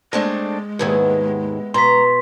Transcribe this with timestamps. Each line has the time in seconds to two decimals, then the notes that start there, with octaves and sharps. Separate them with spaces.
0.13 G#3 A3 C4 D4 G#4
0.79 D#2 G#2 D#3 B3 E4 G#4
1.74 B2 A#5 C6 B6